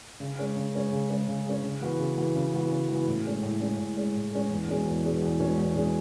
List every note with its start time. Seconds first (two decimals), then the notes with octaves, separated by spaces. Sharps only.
0.20 C#3
0.38 G#3 C#4
0.56 C#3
0.74 G#3 C#4
0.92 C#3
1.10 G#3 C#4
1.28 C#3
1.45 G#3 C#4
1.64 C#3
1.81 E3 B3 F#4
1.99 C#3
2.17 E3 B3 F#4
2.35 C#3
2.53 E3 B3 F#4
2.71 C#3
2.89 E3 B3 F#4
3.07 A2
3.25 G#3 C#4
3.42 A2
3.61 G#3 C#4
3.78 A2
3.97 G#3 C#4
4.14 A2
4.32 G#3 C#4
4.50 E2
4.68 B2 G#3 C#4 G#4
4.86 E2
5.04 B2 G#3 C#4 G#4
5.22 E2
5.40 B2 G#3 C#4 G#4
5.58 E2
5.75 B2 G#3 C#4 G#4